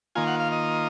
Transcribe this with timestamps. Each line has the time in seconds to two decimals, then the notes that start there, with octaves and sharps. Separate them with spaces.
0.15 D#3 A#3 F4 G#5
0.27 F#5
0.40 F5
0.52 D#5